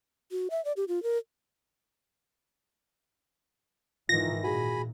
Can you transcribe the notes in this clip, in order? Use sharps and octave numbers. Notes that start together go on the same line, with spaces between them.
F#4
E5
D5
G4
F4
A#4
G#2 D#3 E3 F4 A#6
A#2 F#4 G#4 G#5 B5